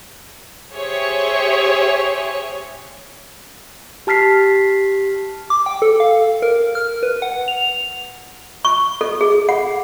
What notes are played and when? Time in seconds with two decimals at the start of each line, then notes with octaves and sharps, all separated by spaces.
0.74 G4 G#4 C5 C#5 E5 C#6
4.07 G4 A5 F6 B6 C7
5.50 D6
5.66 G5
5.82 A4
6.00 F5
6.42 A#4
6.75 F6
7.03 B4
7.22 F#5
7.48 F7
8.65 C#6
9.01 A4
9.21 G#4
9.49 F#5